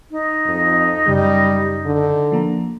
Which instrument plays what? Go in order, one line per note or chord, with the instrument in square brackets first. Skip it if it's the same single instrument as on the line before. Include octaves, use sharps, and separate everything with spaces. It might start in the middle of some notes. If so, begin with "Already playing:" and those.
[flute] D#4
[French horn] F2
[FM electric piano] F#2 C#3 G6 [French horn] G3
[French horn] D3
[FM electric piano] F3 A#3 A#5